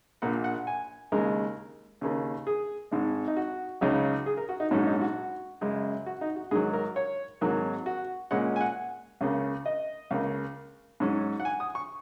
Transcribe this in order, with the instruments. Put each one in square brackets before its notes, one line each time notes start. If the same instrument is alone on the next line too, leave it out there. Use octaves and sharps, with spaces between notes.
[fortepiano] A#1 A#2 A#3 F#5
F#5
G#5
D#2 C#3 G#3 A#4
D#2 C#3 A#3 C#4
G#4
G#1 G#2 G#3
D#4
F#4
C#2 C#3 F#3 D#4
G#4
A#4
F#4
D#4
A#1 G#2 F#3 C#4 F#4
D#4
F#4
F#2 C#3 G#3
F#4
D#4
F#4
G#2 D#3 F#3 G#4
A#4
C#5
G#1 G#2 D#3 F#3 A#3
F#4
A#2 G#3 C#4 F#5
G#5
F#5
C#2 C#3 A#3
D#5
C#2 C#3 A#3
G#2 F#3 C#4
F#5
G#5
D#6
C#6